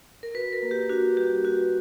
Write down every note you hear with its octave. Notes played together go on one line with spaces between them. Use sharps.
A#4
F#4 B4
A#4
A#3
G4
D4 F#4
G3 G4
F#4